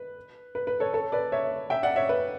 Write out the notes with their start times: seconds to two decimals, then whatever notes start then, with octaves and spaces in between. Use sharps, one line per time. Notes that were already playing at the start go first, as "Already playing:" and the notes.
Already playing: B4
0.55 B4
0.67 B4
0.80 A4 C#5
0.93 A4 C#5
1.12 B4 D5
1.32 C#5 E5
1.70 E5 G5
1.83 D5 F#5
1.96 C#5 E5
2.09 B4